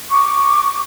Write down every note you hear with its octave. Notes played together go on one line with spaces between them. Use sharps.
C#6 D6